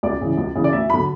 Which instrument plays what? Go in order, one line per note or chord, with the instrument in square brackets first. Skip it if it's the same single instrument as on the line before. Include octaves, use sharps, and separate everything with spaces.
[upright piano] C#2 D5
C#3 E3
C#2
C#3 E3
D5
D2 E5
D3 F#3 B5